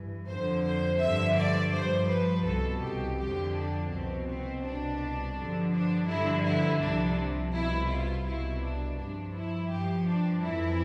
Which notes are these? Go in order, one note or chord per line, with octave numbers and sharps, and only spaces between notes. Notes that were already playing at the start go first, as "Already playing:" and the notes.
Already playing: G2 E3
F2 D3 F3 C5
C5
G2 D3 F3 E5
D5
G2 F3 C5
B4
C2 B2 A4
G4
F2 D3 F3 G4
D4
C2 B2 C4
C4
C2 B2 D4
G2 D3 F3
D4
G2 D3 F3 E4
E4
C2 C3 F3 D4
C2 B2 E4
F4
C2 B2 E4
D4
G2 F3 D4
E4
G2 F3 G4
D4
F2 E3 E4